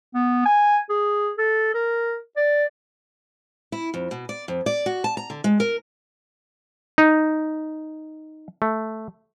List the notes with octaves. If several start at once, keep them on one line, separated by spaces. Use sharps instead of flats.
B3
G#5
G#4
A4
A#4
D5
E4
F2
B2
D5
F2
D5
F#4
A5
A#5
D3
G#3
A#4
D#4
A3